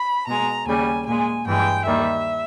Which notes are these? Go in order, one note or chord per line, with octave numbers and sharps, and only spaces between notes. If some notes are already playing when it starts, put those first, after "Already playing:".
Already playing: B5
B2 G#3 A#5
D#2 C#3 G3 G#5
A#2 G#3 G#5
G2 E3 G#3 G5
D#2 D#3 G3 E5